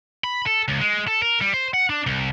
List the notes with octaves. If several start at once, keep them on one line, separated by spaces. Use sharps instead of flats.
B5
A4
C#2
G#3
A4
A#4
G3
C5
F#5
D4
C2